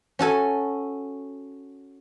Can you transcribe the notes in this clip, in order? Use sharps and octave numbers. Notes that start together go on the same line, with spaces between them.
C#4 F#4 A4 G#5